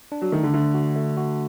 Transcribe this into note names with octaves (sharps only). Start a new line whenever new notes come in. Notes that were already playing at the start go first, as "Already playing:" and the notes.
D4
F#3
D#3 A3
D3
D3 A3
F#4
A3
F#4